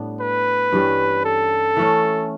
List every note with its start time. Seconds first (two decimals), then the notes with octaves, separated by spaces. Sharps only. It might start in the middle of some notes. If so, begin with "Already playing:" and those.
Already playing: A2 G3 B3 D4
0.20 B4
0.72 G2 E3 G3 C#4
1.25 A4
1.77 E3 A3 C#4